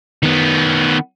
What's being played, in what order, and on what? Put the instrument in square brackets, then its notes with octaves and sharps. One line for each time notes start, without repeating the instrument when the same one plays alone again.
[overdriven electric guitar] D#3 B3